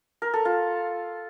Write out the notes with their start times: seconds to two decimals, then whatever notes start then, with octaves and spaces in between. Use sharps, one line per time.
0.22 A#4
0.34 A4
0.45 F4